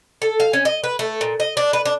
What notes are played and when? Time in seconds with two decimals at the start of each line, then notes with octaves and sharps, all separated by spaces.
0.22 A4
0.40 F5
0.53 C#4
0.65 D#5
0.84 B4
0.99 A3
1.21 A#2
1.40 D#5
1.57 D4
1.73 B4
1.85 D4